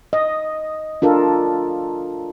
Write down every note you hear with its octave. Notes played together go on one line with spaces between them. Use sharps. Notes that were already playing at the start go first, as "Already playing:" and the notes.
D#5
D4 F4 A4 A#4